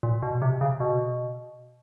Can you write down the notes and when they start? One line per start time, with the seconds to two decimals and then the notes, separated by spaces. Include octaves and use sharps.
0.03 A#2
0.23 B2
0.42 C3
0.61 C#3
0.80 B2